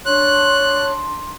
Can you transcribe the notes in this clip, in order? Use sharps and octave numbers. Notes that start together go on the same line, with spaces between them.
D4 C#5 C6 F#6